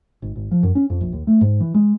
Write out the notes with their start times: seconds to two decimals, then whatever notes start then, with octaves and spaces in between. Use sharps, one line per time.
0.22 G#1
0.36 G#1
0.51 F3
0.63 F#2
0.75 C#4
0.90 F2
1.01 A#1
1.13 D#2
1.27 A3
1.41 G#2
1.60 E3
1.74 G#3